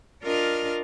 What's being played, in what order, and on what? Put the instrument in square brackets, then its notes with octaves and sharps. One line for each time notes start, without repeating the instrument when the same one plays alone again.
[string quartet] D4 F4 A#4 D#5 F6